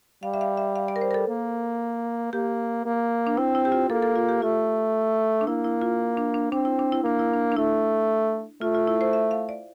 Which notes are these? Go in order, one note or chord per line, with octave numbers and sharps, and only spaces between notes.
G3 F5
E5
F5
E5
F5
D5
A#4
C5
A#4
A4
A#3
A#3 G4
A#3
D4
C4 E4
E4
G4
F4
A#3 A4
A4
F4
G4
A3 F4
D4
A#3 E4
E4
F4
D4
D4
C4 D4
E4
D4
E4
A#3 D4
E4
D4
D4
A3 E4
A3 F4
F4
E4
C5
E5
F5
D5